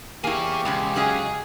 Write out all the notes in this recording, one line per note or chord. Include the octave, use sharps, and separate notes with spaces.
E2 A#3 E4 G4 G#4 C#5
C#2 B2 G#3 C#4
F#3 C#4 G#4 D#5